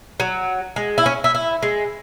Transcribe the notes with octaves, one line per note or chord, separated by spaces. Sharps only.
F#3
G#3
E4
C#4
E4
E4
G#3